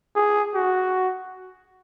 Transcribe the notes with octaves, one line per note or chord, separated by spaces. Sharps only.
G#4
F#4